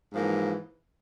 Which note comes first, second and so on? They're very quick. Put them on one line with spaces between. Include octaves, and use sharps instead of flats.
G#2 F3 A#3 E3